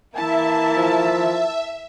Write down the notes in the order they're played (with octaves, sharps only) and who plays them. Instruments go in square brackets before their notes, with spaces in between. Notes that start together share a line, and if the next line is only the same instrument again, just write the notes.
[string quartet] E3 A#3 E4 [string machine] E5 [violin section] A5
[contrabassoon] F3